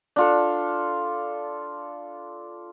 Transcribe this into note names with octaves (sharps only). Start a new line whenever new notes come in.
D4 F4 A4